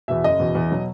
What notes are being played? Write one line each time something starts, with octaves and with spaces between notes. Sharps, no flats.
E2 B2 E5
F#1 D#5
E2 B2
E2
B2 F#3